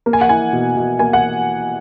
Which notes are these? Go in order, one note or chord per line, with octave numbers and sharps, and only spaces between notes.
A#3
G#5
F#5
E4 G#5
B2
B2
A#3 G#5
F#5